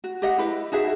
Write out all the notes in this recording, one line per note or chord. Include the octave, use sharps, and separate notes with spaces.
F#4
G4 D#5 F#5
E4 B4
D#4 F#4 G#4 E5